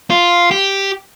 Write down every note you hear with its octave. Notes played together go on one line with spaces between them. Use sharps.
F4
G4